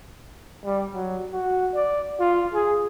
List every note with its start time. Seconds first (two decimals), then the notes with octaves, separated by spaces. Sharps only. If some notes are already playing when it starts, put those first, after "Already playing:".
0.64 G3
0.95 F#3
1.33 F#4
1.75 D5
2.20 F4
2.54 G#4